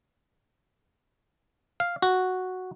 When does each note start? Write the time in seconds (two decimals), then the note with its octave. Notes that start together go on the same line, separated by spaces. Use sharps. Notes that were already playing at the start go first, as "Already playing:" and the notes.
1.80 F5
2.02 F#4